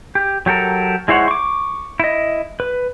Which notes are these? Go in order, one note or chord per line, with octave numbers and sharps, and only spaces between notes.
G4
F#3 G4 A4 A#4
G#3 E4 C5 C#5 F#5
C#6 D6
E4 D#5
B4